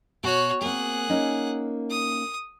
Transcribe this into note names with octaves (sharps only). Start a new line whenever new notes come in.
B2 F#4 C#5
A#3 C4 G#4 F#5
A#3 C#4 D#4
D#6